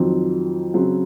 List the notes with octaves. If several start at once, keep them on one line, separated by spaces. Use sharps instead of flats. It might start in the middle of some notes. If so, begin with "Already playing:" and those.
Already playing: F2 D#3 F#3 C4
C#3 F#3 C4